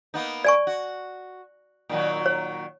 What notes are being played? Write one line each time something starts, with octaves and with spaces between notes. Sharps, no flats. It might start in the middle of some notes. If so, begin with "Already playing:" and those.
A#3 B3 D#4
D5 G#5 C#6
F#4
A#2 D#3 F#3
C#5